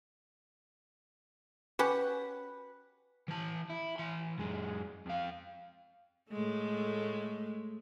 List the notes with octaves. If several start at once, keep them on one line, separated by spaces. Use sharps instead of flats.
C#4 G4 B4 F#5
E3 A5
E4
E3 C6
F#2 G#3
F2 F5
A2 G#3 A3